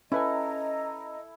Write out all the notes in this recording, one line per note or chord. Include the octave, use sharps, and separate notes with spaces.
C#4 E4 A4 B4 D#5 G#5 A#5 D#6